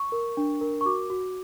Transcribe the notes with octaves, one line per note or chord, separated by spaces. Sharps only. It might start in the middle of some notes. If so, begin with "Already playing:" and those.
Already playing: C#6
A#4
D4
A#4
C#6
F#4 D6
F#4